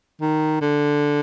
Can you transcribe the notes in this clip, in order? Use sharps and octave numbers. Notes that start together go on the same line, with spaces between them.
D#3
D3